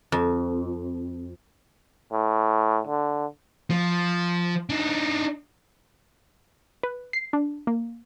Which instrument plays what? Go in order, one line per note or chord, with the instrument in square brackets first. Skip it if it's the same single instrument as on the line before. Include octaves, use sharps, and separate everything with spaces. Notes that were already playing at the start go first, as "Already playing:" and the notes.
[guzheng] F2
[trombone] A2
D3
[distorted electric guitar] F3
D4 D#4
[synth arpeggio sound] B4
C7
D4
A#3